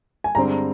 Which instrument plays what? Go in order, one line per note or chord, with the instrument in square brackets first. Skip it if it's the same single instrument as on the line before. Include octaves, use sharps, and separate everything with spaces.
[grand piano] G#5
[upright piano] G2 D3 G#3 C4 [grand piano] A#5